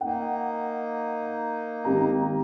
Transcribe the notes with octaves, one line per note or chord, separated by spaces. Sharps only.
A#3 D#4 F#5
G#1 G4 A#5